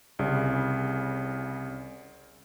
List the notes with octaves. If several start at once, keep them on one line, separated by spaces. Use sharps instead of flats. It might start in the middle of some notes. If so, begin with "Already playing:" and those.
C2 C#3